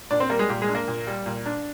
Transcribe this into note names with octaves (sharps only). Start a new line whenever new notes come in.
A#2 D4 D5
C4 C5
G3 A#3 A#4
G#3 G#4
A#2 G4
G#3 G#4
D4
A#3 A#4
A#2
G3
A#2
D4